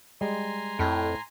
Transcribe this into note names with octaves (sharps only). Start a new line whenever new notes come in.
G3 G#3 G#5 A#5 C6
F2 A2